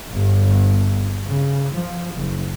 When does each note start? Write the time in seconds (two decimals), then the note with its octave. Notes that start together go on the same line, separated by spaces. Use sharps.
0.13 G1
1.24 C#3
1.73 F3
2.17 F#1